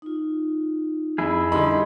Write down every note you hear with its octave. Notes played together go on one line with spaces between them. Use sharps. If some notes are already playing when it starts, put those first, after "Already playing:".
D#4 F4
F2 E4 G#4 G#5 B5
D3 G3 D#4 G4 D#5 B5 C6